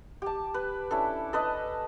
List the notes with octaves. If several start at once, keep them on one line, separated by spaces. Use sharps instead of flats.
G4 A5
B4
C#4 D4 E4 A4
A4 B4 D#5